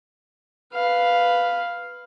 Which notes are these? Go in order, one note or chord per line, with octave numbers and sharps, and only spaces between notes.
B4 F5